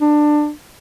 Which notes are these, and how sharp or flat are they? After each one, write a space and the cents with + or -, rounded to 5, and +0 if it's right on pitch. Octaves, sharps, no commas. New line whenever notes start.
D4 +20